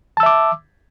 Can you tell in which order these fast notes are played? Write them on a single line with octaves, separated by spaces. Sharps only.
A5 E6 E5 D6